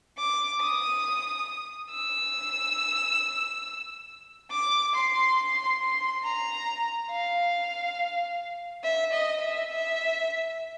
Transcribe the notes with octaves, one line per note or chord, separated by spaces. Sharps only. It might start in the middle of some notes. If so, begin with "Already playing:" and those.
D6
D#6
E6
D6
C6
C6
C6
A#5
F5
E5
D#5
E5
E5